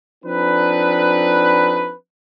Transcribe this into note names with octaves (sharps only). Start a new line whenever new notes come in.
F3 C4 D4 D#4 A4 B4